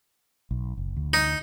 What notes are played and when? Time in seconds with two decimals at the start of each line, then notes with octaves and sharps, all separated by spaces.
0.51 B1
0.77 F#1
0.96 D2
1.13 D#4